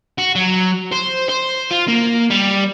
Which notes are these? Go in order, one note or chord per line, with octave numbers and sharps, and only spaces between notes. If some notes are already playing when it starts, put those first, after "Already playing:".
F#4
F#3
C5
C5
F4
A#3
G3